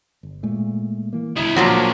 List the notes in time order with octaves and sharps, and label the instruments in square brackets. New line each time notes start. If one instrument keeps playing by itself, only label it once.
[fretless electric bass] G1
A#2 G#3 A3
E3 A#3
[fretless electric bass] D1 C#2 [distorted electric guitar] E4 D#5
[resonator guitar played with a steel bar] A#2 F3 F#3 [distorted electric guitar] A#3 D4